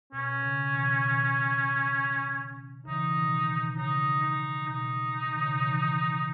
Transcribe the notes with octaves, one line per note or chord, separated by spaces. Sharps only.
B2 C#4
C#3
B2 D#3
B2 D#3
C#3 E3 D#4
B2 D#3
B2 D#3
C#3 D#4
D#4
B2 D#4
D#3
C#3
B2 D#3
C#3 E3